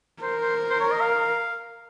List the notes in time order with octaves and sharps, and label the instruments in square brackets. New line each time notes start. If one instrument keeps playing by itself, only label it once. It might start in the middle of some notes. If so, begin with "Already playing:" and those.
[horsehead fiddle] A#4 [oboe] C5
[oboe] C5
C5
C#5
D#5
F5